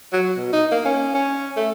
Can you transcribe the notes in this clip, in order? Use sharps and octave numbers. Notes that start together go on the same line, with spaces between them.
F#3
B2
D#4
A#3
C#4
C#4
A3